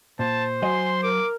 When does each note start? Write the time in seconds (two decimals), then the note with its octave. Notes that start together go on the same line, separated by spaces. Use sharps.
0.19 A#2 C5 A5
0.62 F#3 D#5 G#5 C6
1.03 A#4 D6